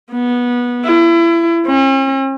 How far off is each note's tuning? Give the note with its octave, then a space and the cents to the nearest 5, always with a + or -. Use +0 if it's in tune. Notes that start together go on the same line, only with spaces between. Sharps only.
B3 -20
E4 +30
C#4 -45